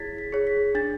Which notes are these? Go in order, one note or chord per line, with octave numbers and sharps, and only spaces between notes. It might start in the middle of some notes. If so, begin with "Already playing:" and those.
Already playing: E4 G#4 C#5 G#6 A6 B6
B6
G#4 C#5
B6
D4 A6